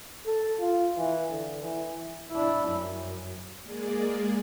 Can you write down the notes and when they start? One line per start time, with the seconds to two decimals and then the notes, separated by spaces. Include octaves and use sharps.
0.26 A4
0.60 F4
0.97 E3
1.31 D3
1.62 E3
2.32 D4 E4
2.69 F#2
3.62 G#3 A#3 G#4 D5